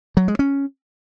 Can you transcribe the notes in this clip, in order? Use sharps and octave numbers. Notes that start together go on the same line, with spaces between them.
F#3
G#3
C#4